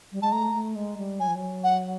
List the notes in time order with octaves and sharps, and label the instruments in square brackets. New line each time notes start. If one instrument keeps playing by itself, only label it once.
[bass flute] G3
[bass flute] G#3 [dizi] A5
[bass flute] A3 [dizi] A#5
[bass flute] A3
G#3
G3
[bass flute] F#3 [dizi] G#5
[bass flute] F3
F#3
[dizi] F#5